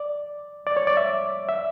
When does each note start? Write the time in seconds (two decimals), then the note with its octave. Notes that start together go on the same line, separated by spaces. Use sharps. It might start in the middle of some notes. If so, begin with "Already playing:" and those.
Already playing: D5
0.67 D5
0.77 C#5
0.87 D5
0.97 E5
1.49 E5